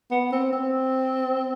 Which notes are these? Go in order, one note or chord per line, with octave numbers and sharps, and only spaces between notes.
B3
C4
C4